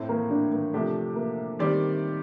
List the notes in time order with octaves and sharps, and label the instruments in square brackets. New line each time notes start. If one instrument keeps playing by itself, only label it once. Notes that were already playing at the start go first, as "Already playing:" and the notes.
Already playing: [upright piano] A2 A3 C4
[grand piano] A#3
D4
A#3
[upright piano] C3 F3 A#3 D4 G4 [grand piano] A3
[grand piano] A#3
[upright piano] D#3 G3 C4 G4 D5